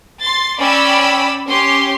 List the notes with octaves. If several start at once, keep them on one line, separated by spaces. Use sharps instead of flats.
C6 A6
C#4 D5 G5 B5 E6
C#4 G4 C#5 C6